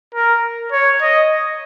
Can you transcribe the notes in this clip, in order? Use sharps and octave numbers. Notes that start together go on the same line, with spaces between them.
A#4
C#5
D#5